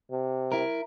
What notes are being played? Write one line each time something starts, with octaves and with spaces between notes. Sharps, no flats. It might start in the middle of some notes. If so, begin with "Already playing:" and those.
C3
E4 A#4